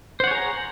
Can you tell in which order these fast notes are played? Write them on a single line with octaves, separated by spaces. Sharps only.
C5 F#5 C#5 G#4 A#5